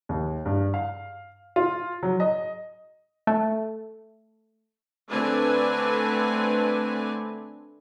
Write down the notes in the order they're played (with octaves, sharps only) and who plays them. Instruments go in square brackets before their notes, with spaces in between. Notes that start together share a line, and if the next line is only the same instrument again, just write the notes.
[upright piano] D#2
G2
F5
F4
F#3
D#5
[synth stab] A3
[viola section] D3 A3 C4 D4 B4 G#5